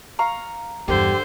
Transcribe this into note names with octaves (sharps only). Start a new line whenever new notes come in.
F5 A#5 C#6
E2 G2 D3 G4 C5